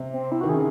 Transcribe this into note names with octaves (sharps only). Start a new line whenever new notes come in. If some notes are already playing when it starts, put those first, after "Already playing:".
Already playing: C3
C4
E4
D#3 F#4
C#3 G#4